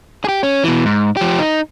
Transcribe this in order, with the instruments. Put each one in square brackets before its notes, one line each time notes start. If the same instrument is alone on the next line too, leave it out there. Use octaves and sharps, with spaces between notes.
[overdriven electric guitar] G4 G#4
C#4
B2 E3
G#2
F3 G4
D#4